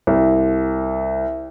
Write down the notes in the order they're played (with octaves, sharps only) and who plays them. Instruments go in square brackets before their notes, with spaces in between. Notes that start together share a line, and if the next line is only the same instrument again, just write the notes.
[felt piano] C2